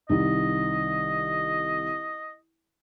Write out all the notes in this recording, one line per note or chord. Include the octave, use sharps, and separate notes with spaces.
C2 D#3 D#5